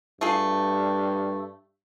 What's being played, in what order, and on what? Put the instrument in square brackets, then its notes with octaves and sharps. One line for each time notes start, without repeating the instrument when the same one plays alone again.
[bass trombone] G2 [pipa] A3 F4 G#4